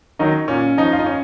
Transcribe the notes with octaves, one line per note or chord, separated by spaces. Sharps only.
D#3 F#3 D#4
A#2 C#4
F3 D#4
F4
D#4
C#4